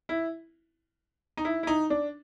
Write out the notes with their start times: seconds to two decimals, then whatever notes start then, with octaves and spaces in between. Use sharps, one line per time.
0.09 E4
1.37 D#4
1.45 E4
1.63 E4
1.67 D#4
1.90 D4